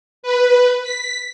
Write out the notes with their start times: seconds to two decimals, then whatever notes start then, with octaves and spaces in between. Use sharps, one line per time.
0.23 B4
0.83 B6